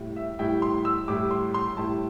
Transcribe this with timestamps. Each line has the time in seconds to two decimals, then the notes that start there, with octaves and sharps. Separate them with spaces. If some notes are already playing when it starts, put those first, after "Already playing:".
Already playing: A2 G3 E4
0.16 E5
0.39 A2 G3 E4 G5
0.62 C6
0.85 E6
1.08 A2 G3 E4 D6
1.31 C6
1.54 C6
1.77 A2 G3 E4 A5